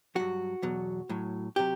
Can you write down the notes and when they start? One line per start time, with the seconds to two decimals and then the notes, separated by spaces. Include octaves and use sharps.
0.15 G2 F#3 F#4
0.62 E2 B2 F#3
1.09 A2 F#3
1.56 C3 F#3 G4